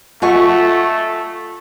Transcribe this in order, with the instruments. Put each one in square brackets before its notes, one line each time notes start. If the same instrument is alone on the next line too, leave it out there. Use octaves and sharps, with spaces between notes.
[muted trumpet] A3 [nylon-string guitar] F4 A4 D#5 [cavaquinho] F#5 G#5 C#6